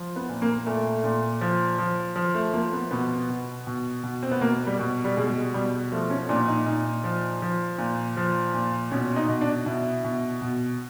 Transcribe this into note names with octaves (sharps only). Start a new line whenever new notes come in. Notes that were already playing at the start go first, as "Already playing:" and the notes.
Already playing: F3
B3
A#2
A#3
A#2 A3
A#2
F3
F3
F3
A3
F3 A#3
B3
B2 B3
B2
B2
B2
C4
B3
B2 A#3
G3
B2
G3
B2 G#3
B2 G3
F3 A3
C#4
A#2 D4
D#4
A#2 D#4
F3
F3
A#2
F3
A#2
B2 C#4
D#4
B2
D4
B2 E4
B2
B2